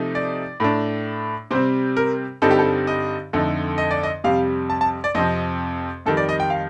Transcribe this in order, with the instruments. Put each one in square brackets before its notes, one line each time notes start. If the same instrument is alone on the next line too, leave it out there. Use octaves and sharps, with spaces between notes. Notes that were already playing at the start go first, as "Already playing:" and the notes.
Already playing: [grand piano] C3 F3 A3 D#4
D5
A2 A3 D4
C3 G3 C4 C5
A#4
G2 D3 G3 C4 D#4 A4
G4
A4
D#5
F2 D3 A3 D#4
D#5
D5
D#5
F2 C3 G3 F5
A5
A5
D5
F2 C3 F3 C4 D#5
F2 D#3 G3 A4
D5
D#5
G5
F5